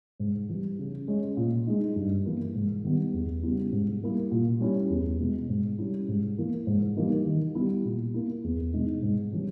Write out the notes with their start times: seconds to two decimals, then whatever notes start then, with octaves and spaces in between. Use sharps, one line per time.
0.20 G#2
0.49 E3 G3
0.79 C#3
1.08 G#3 C#4
1.37 A#2
1.67 G#3 D#4
1.96 G2
2.26 E3 A#3 E4
2.55 G#2
2.84 D#3 G3 B3
3.13 E2
3.43 C#3 G3 B3 E4
3.72 G#2
4.02 G3 A#3 E4
4.32 A#2
4.61 G3 C#4 E4
4.90 E2
5.20 B2 G#3
5.49 G#2
5.79 G3 C#4 E4
6.08 G#2
6.38 E3 A#3 E4
6.67 G#2
6.96 E3 G3 A#3 D#4
7.26 D#3
7.55 G3 B3 E4
7.85 A#2
8.14 A#3 E4
8.44 E2
8.74 B2 G#3 D#4
9.03 G#2
9.32 E3 G3 C#4